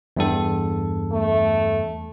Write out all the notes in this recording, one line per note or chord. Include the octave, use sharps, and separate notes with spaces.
E2 G2 A4
A3